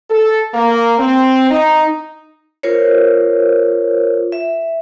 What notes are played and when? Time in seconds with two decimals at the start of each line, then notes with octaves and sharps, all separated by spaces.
0.10 A4
0.54 A#3
0.99 C4
1.51 D#4
2.63 F4 A#4 C5 C#5
4.32 E5